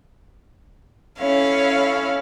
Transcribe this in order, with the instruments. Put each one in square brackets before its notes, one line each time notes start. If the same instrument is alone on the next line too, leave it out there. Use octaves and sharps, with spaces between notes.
[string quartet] C#4 E4 A4 C#5 F5